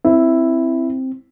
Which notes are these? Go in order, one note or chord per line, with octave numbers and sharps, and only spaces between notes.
C4 E4